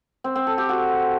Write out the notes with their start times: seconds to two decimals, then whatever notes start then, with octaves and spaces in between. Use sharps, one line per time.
0.24 C4
0.36 C4
0.47 A4
0.58 G4
0.69 F#4